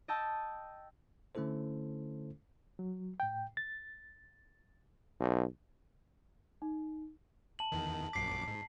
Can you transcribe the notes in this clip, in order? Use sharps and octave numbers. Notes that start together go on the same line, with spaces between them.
D#5 G5 A5 E6
D3 A3 C#4 E4 A4 C5
F#3
A2 G5
A6
B1
D#4
A5 F#7
E2 D#3
A#1 F#2 D6 B6 C7
G#2